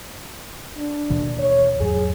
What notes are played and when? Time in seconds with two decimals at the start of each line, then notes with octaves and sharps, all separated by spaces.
0.77 D4
1.10 D#2 B2 E3
1.39 C#5
1.80 E2 G#2 F#3 G#4